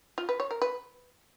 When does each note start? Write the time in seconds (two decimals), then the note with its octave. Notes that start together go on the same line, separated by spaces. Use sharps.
0.18 F4
0.29 B4
0.40 C#5
0.51 A#4
0.62 B4